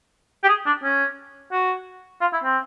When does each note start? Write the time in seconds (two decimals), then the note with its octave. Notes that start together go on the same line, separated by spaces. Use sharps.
0.43 G4
0.48 G#4
0.66 D4
0.84 C#4
1.52 F#4
2.21 F4
2.33 E4
2.44 C4